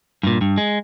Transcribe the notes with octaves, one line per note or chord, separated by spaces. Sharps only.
G2 A#2
G2
G#3